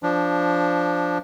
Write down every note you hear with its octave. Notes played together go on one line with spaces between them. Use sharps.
F3 D4